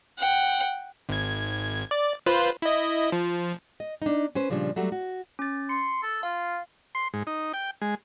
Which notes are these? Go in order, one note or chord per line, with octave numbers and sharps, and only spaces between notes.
F#5 G5
G#1 G#6
D5
F4 B4 C5
E4 D#5
F3
D#5
D4 D#4
C#4 B4 C5
A#2 C#3 F3 G3 D4
F#3 G3 A3 F#4
F#4
C#4 A6
C6 C#7
A4
F4 F5
C6
G#2
D#4
G5
G#3